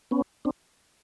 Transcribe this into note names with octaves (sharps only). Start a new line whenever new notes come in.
B3 C#4
C4 D4